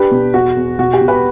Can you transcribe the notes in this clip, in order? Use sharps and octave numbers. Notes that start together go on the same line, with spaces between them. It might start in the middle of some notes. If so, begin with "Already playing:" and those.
Already playing: D4 G4 B4
B2
E2 F#4
E2
B2 F#4
G4
B2
G4 B4